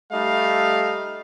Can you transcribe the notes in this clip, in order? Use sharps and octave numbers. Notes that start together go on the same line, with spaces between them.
G3 A3 D#4 F5